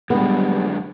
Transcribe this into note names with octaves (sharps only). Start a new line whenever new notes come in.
F#2 D3 G3 G#3 B3